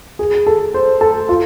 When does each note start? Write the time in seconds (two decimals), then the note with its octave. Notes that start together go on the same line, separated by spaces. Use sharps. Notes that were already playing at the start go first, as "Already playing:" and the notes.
0.19 G#4
0.47 A4
0.74 C5
1.01 A4
1.29 F4